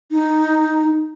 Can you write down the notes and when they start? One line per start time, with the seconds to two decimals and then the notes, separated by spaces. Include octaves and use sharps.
0.11 D#4